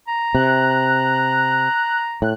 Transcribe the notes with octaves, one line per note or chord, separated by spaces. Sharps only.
A#5
C3 F#6
A2 F#6